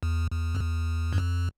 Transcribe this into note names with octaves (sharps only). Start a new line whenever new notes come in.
E2
E2
F2
E2
G2
F2